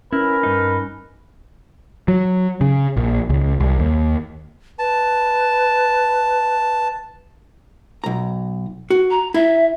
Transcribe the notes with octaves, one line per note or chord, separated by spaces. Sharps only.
C#4 E4 A#4 B4
G2 D#4
F#3
C#3
A#1
C#2
C2
D#2
B4 A5
B1 A#5
F#4
A#5
E4 E5